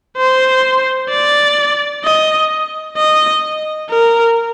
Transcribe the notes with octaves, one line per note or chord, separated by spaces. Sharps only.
C5
D5
D#5
D#5
A#4